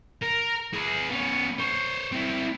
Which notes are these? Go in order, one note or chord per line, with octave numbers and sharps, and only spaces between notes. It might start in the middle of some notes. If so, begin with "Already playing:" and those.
A#4
G#4 B4
B3 C#4
C5 C#5
C4 E4